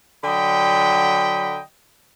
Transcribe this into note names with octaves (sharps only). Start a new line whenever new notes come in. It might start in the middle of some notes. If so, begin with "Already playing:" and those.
D3 F#3 D#5 G5 B5